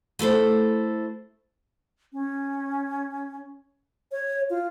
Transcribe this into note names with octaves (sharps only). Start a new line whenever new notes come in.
A3 E4 A4 C5
C#4
C#5
F4